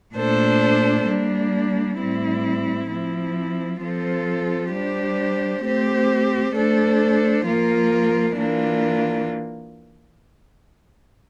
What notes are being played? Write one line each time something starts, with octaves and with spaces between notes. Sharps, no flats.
A#2 A3 D4 A4 C5
G3 A#3 D4
A2 G3 C4 E4
F3 C4 E4
F3 C4 F4 A4 C5
G3 D4 G4 C5
A3 C4 G4 C5
A3 D4 A4 C5
F3 A#3 F4 A#4
E3 A#3 D4 F4 A#4